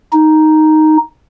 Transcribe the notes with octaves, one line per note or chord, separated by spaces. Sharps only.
D#4